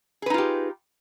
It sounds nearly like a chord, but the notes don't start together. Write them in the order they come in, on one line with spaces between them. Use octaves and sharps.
G#4 B4 D#4 F4 G4